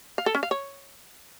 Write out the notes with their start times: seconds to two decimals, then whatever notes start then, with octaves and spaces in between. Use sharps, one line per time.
0.18 F5
0.26 A4
0.35 C#4
0.43 F5
0.51 C#5